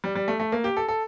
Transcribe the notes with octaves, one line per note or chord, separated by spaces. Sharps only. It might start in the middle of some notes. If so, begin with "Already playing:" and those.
G3
G3
A3
A3
A#3
G4
A4
A4